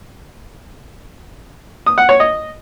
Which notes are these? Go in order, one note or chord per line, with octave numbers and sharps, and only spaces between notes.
D#6
F#5
C#5
D#5